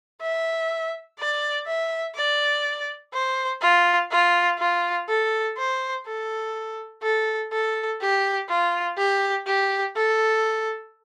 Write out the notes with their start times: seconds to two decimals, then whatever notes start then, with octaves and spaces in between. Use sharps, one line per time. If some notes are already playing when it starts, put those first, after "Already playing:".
0.21 E5
1.19 D5
1.67 E5
2.16 D5
3.13 C5
3.61 F4
4.11 F4
4.59 F4
5.08 A4
5.57 C5
6.06 A4
7.03 A4
7.52 A4
8.01 G4
8.49 F4
8.98 G4
9.47 G4
9.96 A4